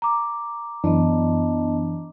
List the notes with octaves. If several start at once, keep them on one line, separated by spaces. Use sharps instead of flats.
A#5 D6
F#2 E3 B3 D4 D#5 A5